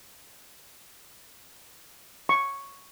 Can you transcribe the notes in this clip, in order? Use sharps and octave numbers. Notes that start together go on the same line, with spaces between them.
C#6